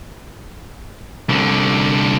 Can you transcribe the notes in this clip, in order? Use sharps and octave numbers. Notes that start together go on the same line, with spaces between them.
C2 D3